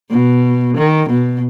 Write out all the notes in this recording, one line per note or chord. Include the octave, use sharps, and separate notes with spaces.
B2
D#3
B2